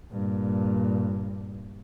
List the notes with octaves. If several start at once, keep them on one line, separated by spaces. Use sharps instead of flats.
G2 A#2